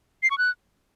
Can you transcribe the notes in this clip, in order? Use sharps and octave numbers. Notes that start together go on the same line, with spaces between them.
C7
C#6
F#6